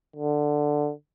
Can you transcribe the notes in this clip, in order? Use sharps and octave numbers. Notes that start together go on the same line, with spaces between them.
D3